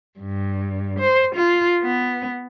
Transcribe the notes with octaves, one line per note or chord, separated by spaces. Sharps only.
G2
C5
F4
B3